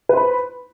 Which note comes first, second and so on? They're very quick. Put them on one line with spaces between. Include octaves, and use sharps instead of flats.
B4 C5 B5